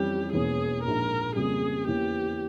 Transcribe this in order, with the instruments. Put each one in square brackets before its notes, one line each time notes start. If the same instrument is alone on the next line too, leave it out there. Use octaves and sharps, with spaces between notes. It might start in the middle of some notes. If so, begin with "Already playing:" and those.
Already playing: [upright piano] F2 E3 G3 C#4 [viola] G4
[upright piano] E1 E2 E3 A#3 C#4 [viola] G#4
[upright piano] A#1 G#2 F3 G#3 [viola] A#4
[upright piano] F2 C#3 G3 A#3 [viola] G#4
[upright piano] E2 E3 A#3 C#4 [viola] G4